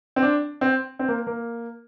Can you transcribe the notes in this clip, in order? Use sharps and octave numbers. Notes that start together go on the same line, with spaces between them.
C4
D4
C4
C4
A#3
A#3